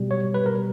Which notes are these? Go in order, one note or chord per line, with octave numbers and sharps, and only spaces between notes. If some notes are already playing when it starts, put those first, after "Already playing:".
Already playing: B2 G3
C#5
B4
A#4